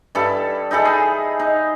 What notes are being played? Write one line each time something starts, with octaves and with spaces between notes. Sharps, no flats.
G2 E4 A4
D#4 E4 G#4 A4
G#4
D#4